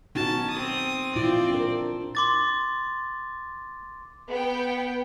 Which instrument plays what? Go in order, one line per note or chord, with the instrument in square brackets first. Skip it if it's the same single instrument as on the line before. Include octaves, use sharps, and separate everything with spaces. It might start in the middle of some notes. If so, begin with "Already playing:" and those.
[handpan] B3 D#4 F#4 [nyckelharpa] C#4 A5
[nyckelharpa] C4 D#6
[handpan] A#2 E4 F4 [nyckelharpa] C4 D5
[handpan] D4 A#4
[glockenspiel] C6 D6 A6
[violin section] B3 G5